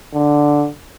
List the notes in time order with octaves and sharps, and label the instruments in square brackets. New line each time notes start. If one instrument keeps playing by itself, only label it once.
[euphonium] D3